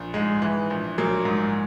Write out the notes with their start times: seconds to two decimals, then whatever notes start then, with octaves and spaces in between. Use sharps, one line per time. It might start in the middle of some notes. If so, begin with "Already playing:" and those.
Already playing: A#1
0.14 G#2 G#3
0.42 E3
0.70 A#1
0.98 A#1 F#3 A#3
1.25 G#2